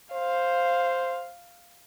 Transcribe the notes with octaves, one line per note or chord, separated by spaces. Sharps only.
C5 F5